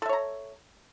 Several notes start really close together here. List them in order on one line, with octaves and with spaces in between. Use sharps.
A4 E5 C#5 A#5